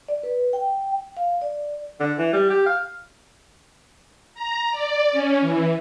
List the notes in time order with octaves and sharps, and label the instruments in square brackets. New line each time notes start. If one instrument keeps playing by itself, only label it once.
[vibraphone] D5
B4
G5
F5
D5
[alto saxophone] D3
E3
G3
G4
F5
[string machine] A#5
D5
C#4
E3